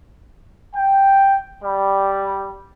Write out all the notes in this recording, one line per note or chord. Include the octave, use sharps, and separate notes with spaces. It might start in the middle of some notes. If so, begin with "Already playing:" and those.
G5
G3